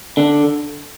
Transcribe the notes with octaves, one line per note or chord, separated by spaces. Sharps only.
D3